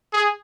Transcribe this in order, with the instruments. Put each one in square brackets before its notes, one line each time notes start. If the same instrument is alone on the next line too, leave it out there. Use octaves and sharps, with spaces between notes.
[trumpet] G#4